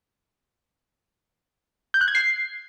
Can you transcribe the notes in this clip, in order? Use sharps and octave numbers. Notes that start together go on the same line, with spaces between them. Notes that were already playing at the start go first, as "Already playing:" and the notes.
G6
F#6
G#6
C7